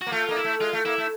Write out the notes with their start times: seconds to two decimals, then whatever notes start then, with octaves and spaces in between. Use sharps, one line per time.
0.01 F#4
0.07 A#3
0.12 A3 F4
0.29 A#3 D#4
0.37 E4
0.44 A3
0.60 G#3 F4
0.73 A3
0.85 A#3 E4
0.98 A3